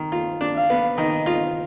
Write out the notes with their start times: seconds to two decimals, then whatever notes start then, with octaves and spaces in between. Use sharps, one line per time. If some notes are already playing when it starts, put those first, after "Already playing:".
Already playing: D#3
0.12 F4
0.41 D4
0.55 F5
0.70 B3
0.97 D#3 D#5
1.26 F4